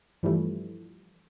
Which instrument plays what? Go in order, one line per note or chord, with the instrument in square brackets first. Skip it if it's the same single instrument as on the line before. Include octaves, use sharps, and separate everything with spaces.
[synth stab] G2 E3 F3 G3 A3